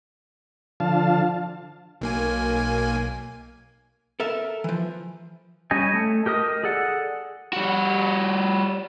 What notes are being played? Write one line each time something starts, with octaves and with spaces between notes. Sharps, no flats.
D3 F3 F5 A5
B1 A#3 G#5
A4 A#4 E5
E3 F3
G3 C#4 G4 D#5 G#5
A3
G4 A#4 D#5 D#6
G#4 A4 D5 F#5
G3 F#4